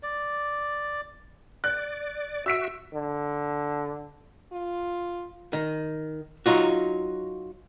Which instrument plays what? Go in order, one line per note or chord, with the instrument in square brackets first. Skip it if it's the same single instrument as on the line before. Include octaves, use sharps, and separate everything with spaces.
[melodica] D5
[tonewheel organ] D5 [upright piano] F#6
[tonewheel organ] F#4 E5 [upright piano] E6 B6 D7
[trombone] D3
[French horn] F4
[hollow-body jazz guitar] D#3
F#3 D#4 F4 F#4